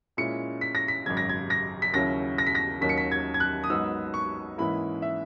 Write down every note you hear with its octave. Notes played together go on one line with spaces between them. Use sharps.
A#2 G#3 C#4 E4 C#7
B6
A#6
B6
G#1 F#2 C#3 G#6
A#6
G#6
A#6
B6
D#2 C#3 F#3 C#4 E4 A#6
A#6
B6
A#6
D#2 D#3 F#3 C#4 B6
C#7
B6
G#6
G#6
F#6
D#6
G#1 G#2 F#3 B3 D#4 E6
C#6
G#2 E3 A#3 C#4 E4 B5
E5